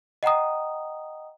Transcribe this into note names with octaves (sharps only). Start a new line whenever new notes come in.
D#5 F#5 G5 A#5 D#6